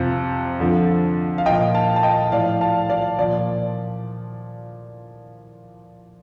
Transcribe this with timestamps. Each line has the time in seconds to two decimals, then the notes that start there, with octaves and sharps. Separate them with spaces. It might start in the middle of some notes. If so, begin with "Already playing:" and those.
Already playing: F2 C3 F3
0.60 F2 D3 F3
1.38 F5
1.46 F3 D#5 G5
1.50 A#2
1.75 F5 A5
1.96 A5
2.03 D#5 G5
2.32 A2 F3 D5 F5
2.61 F5 A5
2.90 D5 F5
3.19 A#2 F3 D5